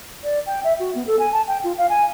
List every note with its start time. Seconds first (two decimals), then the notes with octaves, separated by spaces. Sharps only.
0.24 D5
0.47 G5
0.64 E5
0.80 F#4
0.95 B3
1.07 A4
1.19 G#5
1.32 A5
1.48 G5
1.64 F4
1.78 F5
1.89 G#5